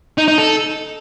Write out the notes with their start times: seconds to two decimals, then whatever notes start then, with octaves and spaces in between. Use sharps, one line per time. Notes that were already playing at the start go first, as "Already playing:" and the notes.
0.18 D#4
0.28 D#4
0.38 A4